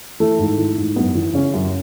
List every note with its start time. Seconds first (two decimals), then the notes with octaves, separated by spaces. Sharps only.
0.20 E3 A3
0.39 G#2
0.58 E3
0.77 G#2
0.96 F#2 B3
1.15 E3
1.34 C#3 C#4
1.53 F#2